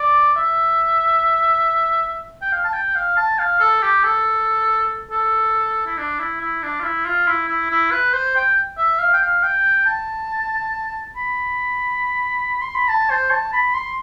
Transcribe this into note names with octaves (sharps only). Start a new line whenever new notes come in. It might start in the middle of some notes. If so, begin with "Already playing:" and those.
Already playing: D5
E5
G5
F5
A5
G5
F5
A5
F5
A4
G4
A4
A4
E4
D4
E4
E4
D4
F4
E4
F4
E4
E4
E4
B4
C5
G5
E5
F5
G5
F5
G5
A5
B5
C6
B5
A5
C5
A5
B5
C6